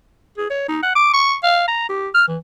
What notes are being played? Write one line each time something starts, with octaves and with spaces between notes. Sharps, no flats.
G#4
C#5
D#4
F#5
D6
C#6
F5
A#5
G4
F6
E3